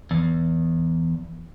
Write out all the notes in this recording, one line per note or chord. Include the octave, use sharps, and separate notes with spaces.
E2